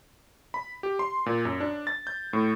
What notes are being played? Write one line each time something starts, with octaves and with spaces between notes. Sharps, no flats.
B5
G4
C6
A#2
F#2
D4
A6
G6
A2